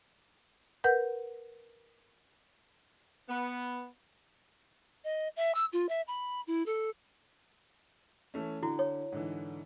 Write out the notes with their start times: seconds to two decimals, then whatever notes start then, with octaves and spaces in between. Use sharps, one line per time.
0.84 A#4 B4 F#5 G6
3.29 B3
5.04 D#5
5.36 E5
5.54 E6
5.72 F4
5.89 E5
6.07 B5
6.47 E4
6.66 A4
8.34 E3 A3 C#4
8.63 D3 E4 F#4
8.79 C#5
9.12 G#2 D3 E3